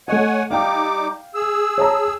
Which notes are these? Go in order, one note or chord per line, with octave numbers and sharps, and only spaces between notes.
A3 C#5 D#5 F#5 G#5
G3 D#4 F5 G5 D6
G#4 E6
C#5 A5 A#5